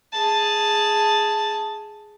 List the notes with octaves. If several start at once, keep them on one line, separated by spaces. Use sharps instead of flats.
G#4 A5